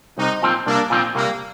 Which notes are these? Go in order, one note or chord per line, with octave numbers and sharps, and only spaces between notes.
C2 C4 D#4
A#2 F3 C4
C2 A#3 D4
A#2 F3 C4
C2 G3 A#3